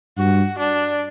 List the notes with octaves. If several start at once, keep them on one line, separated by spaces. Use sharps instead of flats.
G2 F#4
D4